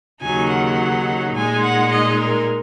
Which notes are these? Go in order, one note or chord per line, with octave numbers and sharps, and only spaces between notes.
D#2 C#3 F#3 D#4 G#5
F#5
A#2 G#3 D#4 G#5
F#5
D#5
A#4